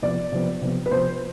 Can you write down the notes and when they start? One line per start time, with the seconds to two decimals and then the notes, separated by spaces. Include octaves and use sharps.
0.02 C3 F3 B3 D5
0.32 C3 F3 B3
0.62 C3 F3 B3
0.86 B4
0.91 C3 F3 B3 C5